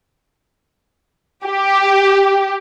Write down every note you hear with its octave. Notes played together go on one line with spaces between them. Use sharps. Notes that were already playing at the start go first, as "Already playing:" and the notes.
G4